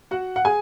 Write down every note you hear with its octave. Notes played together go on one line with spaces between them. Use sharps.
F#4 F#5
F#5
G#4 G#5